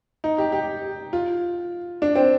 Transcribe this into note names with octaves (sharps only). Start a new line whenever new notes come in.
D#4
G4
G4
F4
D4
C4